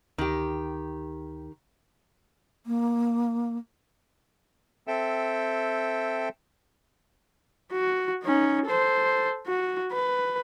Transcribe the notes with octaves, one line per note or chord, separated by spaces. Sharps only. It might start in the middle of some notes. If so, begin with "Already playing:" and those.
D2 D#3 G4
A#3
C4 A4 E5 G5
F#4
C#4 D#4
A4 C5
F#4
B4